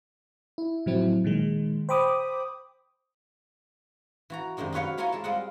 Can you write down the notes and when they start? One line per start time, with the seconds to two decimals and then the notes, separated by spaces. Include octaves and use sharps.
0.58 E4
0.86 A2 C3 F3 F#3 C4 E4
1.24 A#2 D#3 G#3
1.89 C5 G5 B5 D6 D#6
4.30 E3 F#4 A#5
4.57 F#2 C3 D#3 G#3 D4
4.72 D#4 F4 F#4 B4 C#5 F5
4.98 E4 F4 A#4 C#5 D#5 G#5
5.12 G#3 A4 A5
5.24 G3 G#3 C4 F4 D#5 F#5